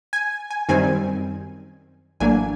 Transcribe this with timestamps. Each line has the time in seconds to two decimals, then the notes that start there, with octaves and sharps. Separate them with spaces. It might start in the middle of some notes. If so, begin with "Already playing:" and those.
0.13 G#5
0.50 G#5
0.69 F#2 D#3 G3 C4 G#5
2.20 A1 A2 F#3 A#3 D4 G#5